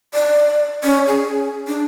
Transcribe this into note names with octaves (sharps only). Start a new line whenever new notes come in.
D5
C#4
G#4
D4